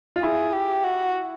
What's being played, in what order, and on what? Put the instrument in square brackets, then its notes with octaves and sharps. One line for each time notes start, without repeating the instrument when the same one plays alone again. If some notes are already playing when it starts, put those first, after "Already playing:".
[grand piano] F4
[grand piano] E4 [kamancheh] G#4
[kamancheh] G4
F#4